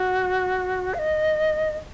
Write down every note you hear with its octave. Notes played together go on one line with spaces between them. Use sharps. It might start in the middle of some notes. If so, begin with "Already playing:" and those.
Already playing: F#4
F5
D#5